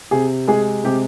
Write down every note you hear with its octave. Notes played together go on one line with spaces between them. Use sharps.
C3 G#4
G#3 G#4
C3 G4